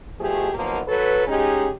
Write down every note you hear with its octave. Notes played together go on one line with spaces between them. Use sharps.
B2 F3 A3 G4 G#4
D#2 B2 F3 F#3 A#3
F#3 A4 B4
G#3 C#4 D#4 G4 G#4